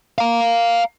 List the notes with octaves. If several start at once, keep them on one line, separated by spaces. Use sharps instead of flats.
F5 A#5